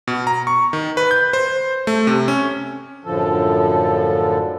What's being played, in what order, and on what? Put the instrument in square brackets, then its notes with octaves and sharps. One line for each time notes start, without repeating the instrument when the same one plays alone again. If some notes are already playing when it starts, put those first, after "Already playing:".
[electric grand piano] B2
A#5
C#6
D#3
B4
G6
C5
A3
C3
C#4
[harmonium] F#2 A2 D3 F3 A4